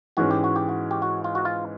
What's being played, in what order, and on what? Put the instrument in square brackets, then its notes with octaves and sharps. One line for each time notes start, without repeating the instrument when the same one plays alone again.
[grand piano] G#2 E3 G#3 C#4 [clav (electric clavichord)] F#4
[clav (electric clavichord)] G4
F#4
G4
F#4
G4
F#4
F4
F#4
F4